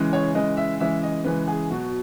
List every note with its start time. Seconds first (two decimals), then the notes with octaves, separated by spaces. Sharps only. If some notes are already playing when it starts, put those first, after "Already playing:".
Already playing: C#3 E3 G#3
0.13 C#5
0.35 C#3 E3 G#3 D#5
0.57 E5
0.80 C#3 E3 G#3 E5
1.03 D#5
1.25 C#3 E3 G#3 B4
1.48 G#4
1.70 B2 F#3 F#4